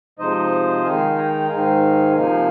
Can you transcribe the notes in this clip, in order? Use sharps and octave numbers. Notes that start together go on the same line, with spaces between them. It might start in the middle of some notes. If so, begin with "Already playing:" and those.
C3 F3 G#3 D#4 C5 D#5
D#3 G#3 D#4 F5 G#5
G5 A#5
G#2 D#3 G#3 D#4 F5 G#5
C3 F3 A#3 D#4 F5 G#5